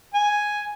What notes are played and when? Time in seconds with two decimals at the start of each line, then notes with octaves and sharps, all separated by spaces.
0.14 G#5